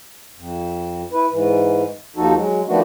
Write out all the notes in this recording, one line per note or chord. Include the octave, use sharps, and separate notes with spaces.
F2
E4 B4
G#2 E3
D#2 F3 D#4 F#4 A4
F#3 G#3
D#3 F3 A3 B3 D4 F#4